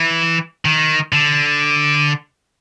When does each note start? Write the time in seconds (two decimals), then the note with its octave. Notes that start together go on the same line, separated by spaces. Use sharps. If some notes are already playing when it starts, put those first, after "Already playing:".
Already playing: E3
0.65 D#3
1.13 D3